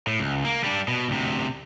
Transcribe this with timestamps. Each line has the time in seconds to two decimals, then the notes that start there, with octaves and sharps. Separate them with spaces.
0.07 A2
0.20 C#2
0.45 A#3
0.64 G3 D4
0.88 B2
1.09 D2 C3